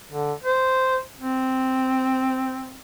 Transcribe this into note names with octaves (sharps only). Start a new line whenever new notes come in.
D3
C5
C4